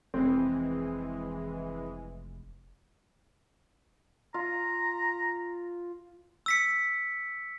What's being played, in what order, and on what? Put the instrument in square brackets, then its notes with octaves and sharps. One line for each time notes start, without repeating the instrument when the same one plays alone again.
[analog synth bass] F1 [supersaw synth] E3 G#3 [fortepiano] C4
[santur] F4 [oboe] A#5
[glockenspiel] E6 B6 C#7